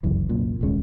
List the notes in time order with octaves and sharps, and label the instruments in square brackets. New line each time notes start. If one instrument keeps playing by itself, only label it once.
[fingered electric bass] G1 C#2 F#2 E3
C2 F#2 A#2
D#1 C2 G#3 C#4